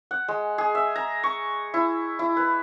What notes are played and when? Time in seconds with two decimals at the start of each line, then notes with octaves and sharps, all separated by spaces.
0.11 F#5
0.28 G#3
0.58 G#4
0.75 E5
0.96 A#5
1.23 C#6
1.74 E4
2.19 E4
2.37 B4